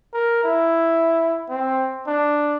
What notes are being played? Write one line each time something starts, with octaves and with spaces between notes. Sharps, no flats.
A#4
E4
C4
D4